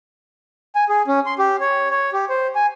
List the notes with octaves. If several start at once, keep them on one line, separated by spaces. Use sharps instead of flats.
G#5
G#4
C#4
C6
G4
C#5
C#5
G4
C5
G#5